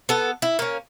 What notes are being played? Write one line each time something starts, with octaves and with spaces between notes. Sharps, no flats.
B3 A4
E4
A#3 C#4